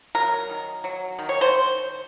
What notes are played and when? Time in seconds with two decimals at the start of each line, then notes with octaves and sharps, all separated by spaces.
0.15 F#3 A#4
0.50 D#3
0.84 F#3
1.19 D#3
1.29 C#5
1.41 C5